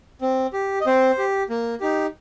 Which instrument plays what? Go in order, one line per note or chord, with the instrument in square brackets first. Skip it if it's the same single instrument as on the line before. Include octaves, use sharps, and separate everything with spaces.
[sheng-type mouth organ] C4
G4
D#5
C4 C5
G4
A#3
D#4 G4